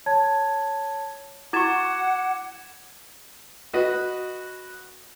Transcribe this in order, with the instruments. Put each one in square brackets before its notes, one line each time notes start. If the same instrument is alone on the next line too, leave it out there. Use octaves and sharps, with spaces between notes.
[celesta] C#5 A5 G#6
[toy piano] E4 F#4 C#6 [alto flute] F#5 [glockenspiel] D6 G#6 E7
[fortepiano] F#4 B4 D#5